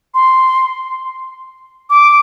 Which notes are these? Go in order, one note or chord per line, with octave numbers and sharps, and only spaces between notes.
C6
D6